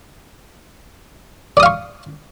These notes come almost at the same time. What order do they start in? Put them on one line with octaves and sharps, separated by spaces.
D5 D#6 F5 C#6